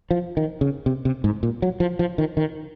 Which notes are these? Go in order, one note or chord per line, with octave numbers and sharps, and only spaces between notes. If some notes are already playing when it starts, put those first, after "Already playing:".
F3
D#3
C#3
C3
C3
G#2
A#2
F#3
F3
F3
D#3
D#3